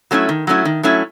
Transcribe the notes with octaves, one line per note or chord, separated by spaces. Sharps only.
F#3 A3 C#4 E4
D#3
F#3 A3 C#4 E4
D#3
F#3 A3 C#4 E4